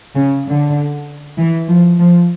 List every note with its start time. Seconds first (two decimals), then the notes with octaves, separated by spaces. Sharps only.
0.16 C#3
0.47 D3
1.38 E3
1.69 F3
1.99 F3